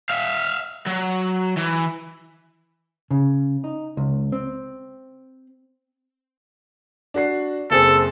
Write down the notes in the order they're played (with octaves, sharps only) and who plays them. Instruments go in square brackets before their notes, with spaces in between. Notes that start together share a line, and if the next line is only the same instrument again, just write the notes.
[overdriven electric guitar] E5 F5
F#3
E3
[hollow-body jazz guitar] C#3
D#4
C#2
C4
[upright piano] D4 F#4 C7
[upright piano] F#1 C4 G#4 [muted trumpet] A4